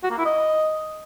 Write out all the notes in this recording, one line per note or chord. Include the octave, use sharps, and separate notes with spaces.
F#4
A#3
E4
D#5